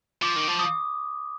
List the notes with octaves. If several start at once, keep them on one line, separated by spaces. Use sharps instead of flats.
F3 D6
D#3
F3
D#6